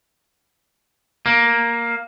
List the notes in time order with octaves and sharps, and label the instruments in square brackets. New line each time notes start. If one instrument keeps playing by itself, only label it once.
[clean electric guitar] A#3